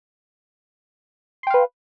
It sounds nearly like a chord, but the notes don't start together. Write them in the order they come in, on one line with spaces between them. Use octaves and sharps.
C6 G5 F5 B4